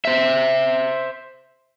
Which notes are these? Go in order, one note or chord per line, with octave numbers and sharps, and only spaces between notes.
C5 E5